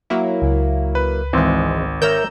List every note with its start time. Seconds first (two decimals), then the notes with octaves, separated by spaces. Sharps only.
0.10 F#3 A#3 E4
0.42 C#2
0.95 B4
1.33 G#1 E3 G#3 C4
2.02 A#4 C#5 E5 A#5 E6 G6